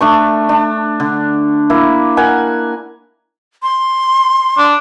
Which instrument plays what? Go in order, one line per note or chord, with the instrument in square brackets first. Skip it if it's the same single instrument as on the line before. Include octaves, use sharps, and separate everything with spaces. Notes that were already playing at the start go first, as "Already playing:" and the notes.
[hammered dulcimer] A3 D4 C#6
D4
D3
A#3 E4
A#4 F#5 G#5
[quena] C6
[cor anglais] D4